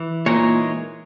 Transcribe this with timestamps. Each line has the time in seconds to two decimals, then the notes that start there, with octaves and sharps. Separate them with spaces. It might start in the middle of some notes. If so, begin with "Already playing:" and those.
Already playing: E3
0.26 A#2 E3 G#3 D#4 A#4 C#5